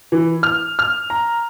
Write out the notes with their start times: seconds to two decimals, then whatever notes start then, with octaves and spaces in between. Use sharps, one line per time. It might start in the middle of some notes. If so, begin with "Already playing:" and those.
0.12 E3
0.43 F6
0.79 F6
1.10 A#5